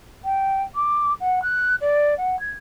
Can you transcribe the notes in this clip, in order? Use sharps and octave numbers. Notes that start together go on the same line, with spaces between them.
G5
D6
F#5
F#6
D5
F#5
G#6